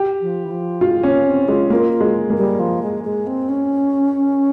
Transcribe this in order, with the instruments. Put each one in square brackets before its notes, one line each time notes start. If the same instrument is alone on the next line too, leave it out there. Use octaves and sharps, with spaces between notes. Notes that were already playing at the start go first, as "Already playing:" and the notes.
Already playing: [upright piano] G4
[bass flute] F3
E3
F3
[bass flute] G#3 [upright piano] F4
[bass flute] A#3 [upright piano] C#4
[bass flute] C4
[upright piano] G#3 [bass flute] F4
[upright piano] A#3 [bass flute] F4
[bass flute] F4
[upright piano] G#3
A#3
[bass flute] G3
F3
G#3
G#3
C4
C#4